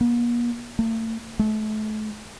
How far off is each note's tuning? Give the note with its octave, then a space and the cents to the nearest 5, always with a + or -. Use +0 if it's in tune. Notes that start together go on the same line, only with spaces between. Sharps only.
A#3 +45
A3 +40
A3 -35